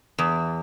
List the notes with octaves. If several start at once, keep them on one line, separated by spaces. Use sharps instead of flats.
E2